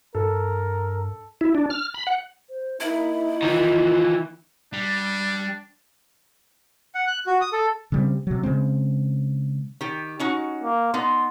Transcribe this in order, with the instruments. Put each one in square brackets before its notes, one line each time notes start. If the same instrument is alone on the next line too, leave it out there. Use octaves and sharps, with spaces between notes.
[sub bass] G2 [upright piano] A4 [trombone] A#4
[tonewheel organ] E4
D4
F6
B5
F#5
[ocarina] C5
[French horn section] A#3 D#4 [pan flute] E4 [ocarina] E5
[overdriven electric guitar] D#3 E3 [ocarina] F4
[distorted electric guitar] G3 [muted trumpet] D4
[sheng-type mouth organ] F#5
F#6
F#4
D#6
A4
[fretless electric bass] C#3 G3 C4
C3 F#3
C#3 G#3 C4
[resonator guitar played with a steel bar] D#3 G4
C#4 D#4 F#4
[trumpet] A#3
[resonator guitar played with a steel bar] B3 D#4 [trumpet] C6